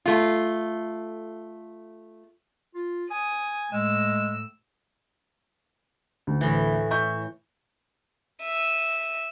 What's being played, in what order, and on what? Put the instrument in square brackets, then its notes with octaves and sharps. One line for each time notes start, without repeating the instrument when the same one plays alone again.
[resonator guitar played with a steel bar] A3 F4
[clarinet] F4
[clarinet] G#5 [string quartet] D#6
[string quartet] A2 E6 [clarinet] G#3
[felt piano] D2
[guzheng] A2 E3
[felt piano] E5 C#6 G6
[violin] E5 D#7